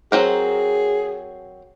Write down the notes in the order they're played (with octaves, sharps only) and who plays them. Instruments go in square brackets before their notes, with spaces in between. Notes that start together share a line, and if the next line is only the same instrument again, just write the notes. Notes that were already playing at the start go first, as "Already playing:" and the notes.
[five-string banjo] F#3 C4 A#4 [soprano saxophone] G#4